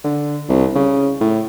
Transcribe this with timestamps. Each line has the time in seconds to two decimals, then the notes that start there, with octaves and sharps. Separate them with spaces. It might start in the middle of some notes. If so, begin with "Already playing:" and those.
0.04 D3
0.49 C2
0.75 C#3
1.20 A2